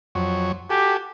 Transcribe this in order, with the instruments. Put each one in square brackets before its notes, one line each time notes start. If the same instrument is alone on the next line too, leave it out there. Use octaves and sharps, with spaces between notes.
[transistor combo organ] F2 F#3 C#5
[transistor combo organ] F#4 A4 G#5 [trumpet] G4